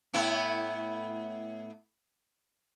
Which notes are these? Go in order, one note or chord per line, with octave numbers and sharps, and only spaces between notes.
A2 B3 E4